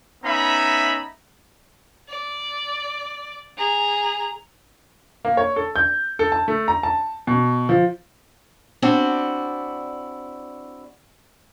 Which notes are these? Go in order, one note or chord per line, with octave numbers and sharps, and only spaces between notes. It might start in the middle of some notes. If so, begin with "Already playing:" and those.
B3 C#4 D#4 E5 A#5 B5
D5
G#4 A#5
A#3
C#5
A4
G6
A4
A5
A3
A#5
A5
B2
F3
C4 D4 E4 F#4